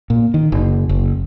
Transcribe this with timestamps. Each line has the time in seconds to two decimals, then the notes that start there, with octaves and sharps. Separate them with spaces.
0.10 A#2
0.34 D#3
0.52 F#1
0.89 F#1